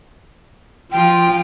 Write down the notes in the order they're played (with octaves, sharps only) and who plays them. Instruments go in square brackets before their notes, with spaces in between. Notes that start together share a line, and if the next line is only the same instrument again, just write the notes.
[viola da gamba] F3 F4 [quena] G5